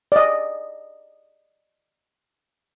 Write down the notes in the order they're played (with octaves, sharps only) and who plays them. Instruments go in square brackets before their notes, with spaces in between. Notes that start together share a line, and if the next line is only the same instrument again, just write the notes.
[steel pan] D5 D#5